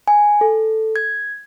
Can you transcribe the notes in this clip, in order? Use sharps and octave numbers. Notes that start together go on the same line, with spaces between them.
G#5
A4
G#6